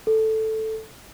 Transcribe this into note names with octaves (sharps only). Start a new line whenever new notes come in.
A4